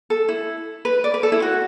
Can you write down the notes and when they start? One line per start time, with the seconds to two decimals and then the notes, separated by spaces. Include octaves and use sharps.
0.10 A4
0.28 E4
0.85 B4
1.04 D5
1.14 B4
1.23 A4
1.32 E4
1.42 F#4